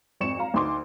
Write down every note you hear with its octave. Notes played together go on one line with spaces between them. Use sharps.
G#1 F2 C#6 C#7 E7
F5 A#5
D2 D#4 C6 D6